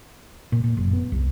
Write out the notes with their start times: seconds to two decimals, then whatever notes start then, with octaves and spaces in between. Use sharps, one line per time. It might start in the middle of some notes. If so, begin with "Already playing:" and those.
0.52 A#2
0.64 A#2
0.77 F#1
0.93 B3
1.12 C2